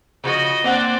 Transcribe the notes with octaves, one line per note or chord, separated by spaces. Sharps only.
C#3 F3 F#4 D#5
A#3 C4 D4 D5 F#5